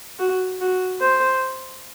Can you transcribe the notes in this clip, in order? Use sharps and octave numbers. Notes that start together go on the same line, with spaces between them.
F#4
F#4
C5